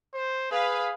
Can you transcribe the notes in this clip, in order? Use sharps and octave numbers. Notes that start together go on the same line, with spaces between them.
C5
G#4 B4 F5